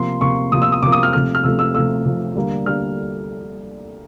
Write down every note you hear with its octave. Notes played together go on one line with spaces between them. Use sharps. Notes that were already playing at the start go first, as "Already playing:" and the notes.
Already playing: C3 F3 A#3 C6
C3 F3 A#3 C#6
C3 F3 A#3 D#6
E6
D#6
C3 F3 A#3 D6
D#6
F6
C3 F3 A3 F6
F6
C3 F3 A3 E6
E6
C3 F3 A3 E6
C3 F3 A3
D3 G3 A#3
D3 G3 A#3 F6